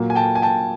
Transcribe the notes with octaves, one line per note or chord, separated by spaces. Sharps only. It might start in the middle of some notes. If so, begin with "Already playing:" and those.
Already playing: A#2 F#3 A#3
G#5
G5 A5
G#5
G5 A5